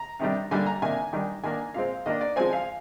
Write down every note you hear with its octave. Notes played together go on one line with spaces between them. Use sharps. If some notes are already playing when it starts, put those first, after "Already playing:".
Already playing: A#5
C3 D#3 G3 D4
D3 G3 A#3 D4 G#5
A#5
C3 D#3 A#3 D4 G#5
D#3 G3 D4
D#3 A#3 D4 G#5
A#2 G#3 C4 F5
D#3 A#3 D4 D#5
D5
F3 G#3 C4 G#5
F5